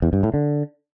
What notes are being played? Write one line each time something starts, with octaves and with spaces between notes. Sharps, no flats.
E2
G2
A2
D3